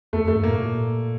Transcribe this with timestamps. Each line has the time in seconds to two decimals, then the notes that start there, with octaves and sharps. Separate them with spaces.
0.13 E2 A3
0.24 F2
0.28 A3
0.36 G2
0.44 A2 A#3
0.58 A#2